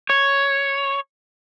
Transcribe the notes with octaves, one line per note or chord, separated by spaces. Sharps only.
C#5